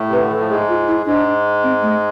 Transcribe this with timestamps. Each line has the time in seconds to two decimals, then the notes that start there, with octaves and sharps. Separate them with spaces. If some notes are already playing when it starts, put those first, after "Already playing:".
Already playing: A2 A3
0.08 C3 B4
0.19 D3
0.30 E3 A4
0.40 F3
0.49 G#2 G#3 G#4
0.69 F4
0.88 E4
1.06 G#2 G#3 D4
1.63 C4
1.82 A3